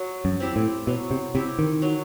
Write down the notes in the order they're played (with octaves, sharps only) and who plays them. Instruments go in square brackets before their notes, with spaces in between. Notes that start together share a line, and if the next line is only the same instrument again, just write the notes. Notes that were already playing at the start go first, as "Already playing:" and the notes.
Already playing: [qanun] F#3
[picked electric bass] F#2
[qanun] C4 E4 G4
[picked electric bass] A2
[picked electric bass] B2 [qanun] F#3
[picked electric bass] C3
[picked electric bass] C3 [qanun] C4 E4 G4
[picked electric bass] D#3
[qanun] F#3